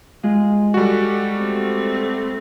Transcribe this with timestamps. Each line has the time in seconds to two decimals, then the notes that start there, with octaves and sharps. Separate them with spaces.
0.23 G#3 F4 G#4
0.74 G3 F#4 A4
1.36 A3 C4